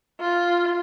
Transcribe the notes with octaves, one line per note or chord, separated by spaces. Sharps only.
F4